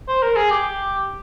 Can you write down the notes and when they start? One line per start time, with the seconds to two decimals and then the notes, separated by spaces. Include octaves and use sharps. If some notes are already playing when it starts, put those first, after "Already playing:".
0.08 C5
0.22 A#4
0.36 G#4
0.50 G4